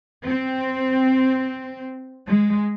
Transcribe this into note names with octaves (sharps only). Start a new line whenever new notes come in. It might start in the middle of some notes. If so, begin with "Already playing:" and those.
C4
G#3